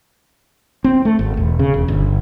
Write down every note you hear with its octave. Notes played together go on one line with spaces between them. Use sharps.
C4
A3
G#1
E1
C#3
E1
G1